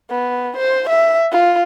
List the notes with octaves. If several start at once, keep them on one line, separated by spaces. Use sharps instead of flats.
B3
C5
E5
F4